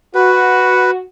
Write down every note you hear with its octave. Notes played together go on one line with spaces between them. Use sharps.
F#4 B4